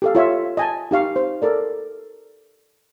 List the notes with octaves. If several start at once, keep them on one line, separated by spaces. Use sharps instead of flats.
G4 A4 F5
F4 C#5 E5
D#5 G#5 A5
D#4 G4 F5 C#6
C5
A4 A#4 D5